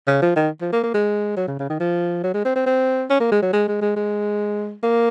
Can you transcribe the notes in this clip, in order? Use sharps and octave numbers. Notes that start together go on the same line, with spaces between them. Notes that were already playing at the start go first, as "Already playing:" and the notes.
C#3
F3
D#3
F3
A#3
A#3
G#3
F#3
C#3
C#3
D#3
F3
F#3
G#3
C4
C4
C4
C#4
A#3
G#3
F#3
G#3
G#3
G#3
G#3
A#3